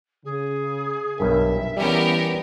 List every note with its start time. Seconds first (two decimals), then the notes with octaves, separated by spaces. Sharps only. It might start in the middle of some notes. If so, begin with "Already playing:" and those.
0.25 C#3 G#4
1.18 B1 G2 D4 A#4 E5 G#5
1.77 E3 G3 B3 C#4 G4 A#4